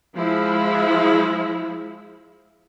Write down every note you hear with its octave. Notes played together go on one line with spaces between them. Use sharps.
F3 G#3 E4